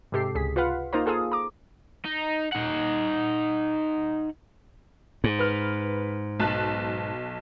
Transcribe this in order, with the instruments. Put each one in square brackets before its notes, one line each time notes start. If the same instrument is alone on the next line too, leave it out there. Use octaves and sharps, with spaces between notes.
[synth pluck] G#2 C3 G4 A4 C7
C#2 G#4 B6
F4 B4 F5 F#5
A#3 D#4 F4 A#4 C5 A#5
F4 G#4 A4 F5 D#6
A#5 D6
[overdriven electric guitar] D#4
D#4 F#5
[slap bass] G#2
[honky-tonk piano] B4 F6
B1 A5 F#6